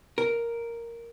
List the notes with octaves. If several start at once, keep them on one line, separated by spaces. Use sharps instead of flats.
A#4